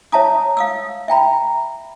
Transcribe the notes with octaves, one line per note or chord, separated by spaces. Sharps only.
C#5 E5 A5 A#5 D#6
F5 D#6 E6
E5 G5 A#5 B5